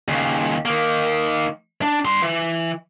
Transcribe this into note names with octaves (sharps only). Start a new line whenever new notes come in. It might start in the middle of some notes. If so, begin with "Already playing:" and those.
D#2 C#3
D#3 A#3
D4
G2 C6
E3